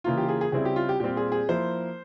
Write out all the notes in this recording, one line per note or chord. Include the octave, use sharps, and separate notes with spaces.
C#3 E3 A#3 F4
G4
G#4
G#4
C#3 G3 C4 E4 G#4
G4
F4
G4
A#2 G3 C4 F4 G4
G#4
G#4
F3 A#3 E4 C5